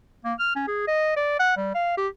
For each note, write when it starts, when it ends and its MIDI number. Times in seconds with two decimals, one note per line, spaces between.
0.25 0.34 58
0.39 0.51 89
0.56 0.65 61
0.68 0.87 68
0.88 1.16 75
1.16 1.35 74
1.40 1.52 78
1.57 1.70 55
1.75 1.96 77
1.97 2.08 67